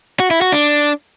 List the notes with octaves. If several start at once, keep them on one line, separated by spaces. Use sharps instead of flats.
F#4
E4
F#4
D4